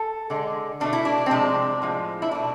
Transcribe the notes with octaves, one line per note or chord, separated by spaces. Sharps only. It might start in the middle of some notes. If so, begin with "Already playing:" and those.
Already playing: A4
D3 G#3
B2 A3 D4
E4
D4
C4
C3 F3 G#3 D4
A2 F3 G#3
E4
B2 A3 D4